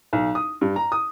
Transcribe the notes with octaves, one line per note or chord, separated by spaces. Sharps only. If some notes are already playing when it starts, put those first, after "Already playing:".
B1
D#6
G2
A#5
D#6